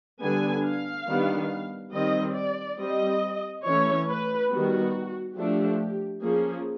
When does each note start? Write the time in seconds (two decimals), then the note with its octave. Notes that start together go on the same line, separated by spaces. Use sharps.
0.21 D3 G3 B3 D4 G#5
0.66 F5
1.07 D#3 G3 B3 D4
1.94 D#3 G3 C4 D#5
2.36 D5
2.79 G3 C4 D#5
3.66 E3 A3 C#4 C#5
4.09 B4
4.51 D#3 G3 B3 F#4
5.37 F3 A3 D4 G4
6.23 F3 A#3 C#4 G#4